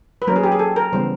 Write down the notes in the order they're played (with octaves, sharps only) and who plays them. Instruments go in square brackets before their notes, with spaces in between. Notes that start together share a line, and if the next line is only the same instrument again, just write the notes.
[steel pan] B4
F#3 A#3 C#4 A#4
G#4
G4
G#4
A4
A#4
C#3 E3 G3 B3 C5